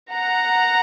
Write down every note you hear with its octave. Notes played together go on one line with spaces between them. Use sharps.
F#5 A#5